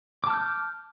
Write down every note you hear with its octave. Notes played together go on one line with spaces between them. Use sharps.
A5 D6 F6 G6